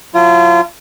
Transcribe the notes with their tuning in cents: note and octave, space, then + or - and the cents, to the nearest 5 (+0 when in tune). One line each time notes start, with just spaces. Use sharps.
F#3 -45 F4 -35